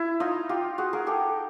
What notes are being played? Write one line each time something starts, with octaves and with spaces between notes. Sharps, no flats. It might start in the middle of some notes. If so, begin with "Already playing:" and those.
Already playing: E4
D#4 F4
F4 G4
F#4 G#4
G#4 A#4
G4 A4